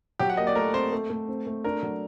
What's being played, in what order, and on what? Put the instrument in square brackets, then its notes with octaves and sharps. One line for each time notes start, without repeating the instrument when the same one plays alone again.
[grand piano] F#3 [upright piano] G4
[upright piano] F#5
[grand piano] A#3 [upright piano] D#5
[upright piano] D5
[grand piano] A3 [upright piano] A#4
[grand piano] C4 [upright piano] C5
[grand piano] A3
A3
C4
A3
[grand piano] D4 [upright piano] A#4
[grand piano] F#3